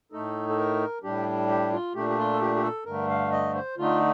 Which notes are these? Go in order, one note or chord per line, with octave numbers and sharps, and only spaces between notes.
A2 A3 D#4 A4
A4
A#4
A2 G3 D4 G4
G4
F4
A#2 A3 D4 G4
G4
F4
A4
G4
G4
A4
G2 D3 A3 A#4
F5
D#5
C5
D3 A3 D#4 F4